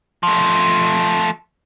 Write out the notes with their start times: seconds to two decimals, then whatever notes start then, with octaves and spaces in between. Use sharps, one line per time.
0.23 F3 A3